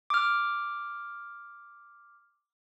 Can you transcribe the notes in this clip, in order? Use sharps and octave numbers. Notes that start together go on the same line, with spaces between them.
D6 F6